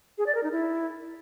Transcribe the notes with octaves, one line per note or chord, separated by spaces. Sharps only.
G#4
D5
A#4
D#4
E4